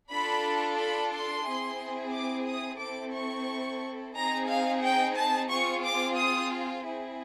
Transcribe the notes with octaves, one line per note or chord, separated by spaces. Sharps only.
D4 F4 A4 B5
B5
C6
C4 E4 G#4
D6
D#6
C4 E4 A4 D6
C#6
C4 D#4 G#4 A#5
F5
G5
A5
C4 F4 G#4 C#6
D6
D#6
C4 E4 G#4